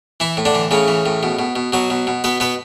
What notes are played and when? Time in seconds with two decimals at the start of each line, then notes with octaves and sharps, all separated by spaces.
0.20 E3 E4
0.37 A2
0.45 D3 D4
0.55 E3
0.71 A2 C#3 C#4
0.88 E3
1.06 A2
1.23 B2
1.39 B2
1.56 B2
1.73 B2 F#3 F#4
1.90 B2
2.07 B2
2.24 B2 B3 B4
2.40 B2 B3 B4